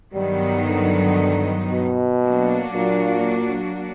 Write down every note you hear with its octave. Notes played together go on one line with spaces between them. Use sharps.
G2 D#3 F#3 G3 B3 D#4
D3
B2
F#3 A#3 D4 F#4
A#2